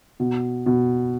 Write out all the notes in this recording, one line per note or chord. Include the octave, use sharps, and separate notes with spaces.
B2
B2